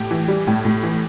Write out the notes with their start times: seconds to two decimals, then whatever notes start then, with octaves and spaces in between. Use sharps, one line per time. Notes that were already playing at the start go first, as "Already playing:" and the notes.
Already playing: A2 G4
0.11 E3
0.28 G3
0.47 A2
0.65 A2
0.83 E3